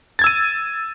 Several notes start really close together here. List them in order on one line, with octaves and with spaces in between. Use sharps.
A6 G#6 E6 D#7